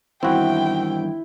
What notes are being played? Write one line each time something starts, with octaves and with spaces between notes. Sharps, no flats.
E2 G2 D#3 C4 E4 F#4 G5